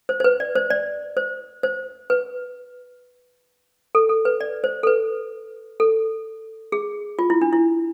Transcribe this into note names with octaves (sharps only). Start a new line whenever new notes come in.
C5
C5
B4
D5
C5
D5
C5
C5
B4
A4
A4
B4
D5
C5
A4
B4
A4
G#4
F4
E4
D4
E4